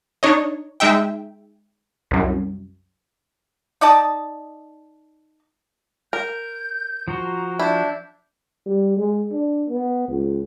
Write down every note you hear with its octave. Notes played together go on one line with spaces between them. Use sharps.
D4 D#4 C#5 D#5
G#3 D#4 E5 G5
C2 F#2
D#4 D5 D#5 A5
A#4 G6
F3 F#4 C5 A#5
D4 E4 G6
G3
G#3
D4
B3
C#2